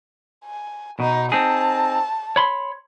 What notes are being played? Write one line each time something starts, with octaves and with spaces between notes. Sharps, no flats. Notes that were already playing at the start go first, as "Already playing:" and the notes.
G#5
B2 D#4
C4 D#4 G#4 A5
C#5 B5 C6